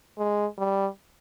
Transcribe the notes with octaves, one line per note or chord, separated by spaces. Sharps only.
G#3
G3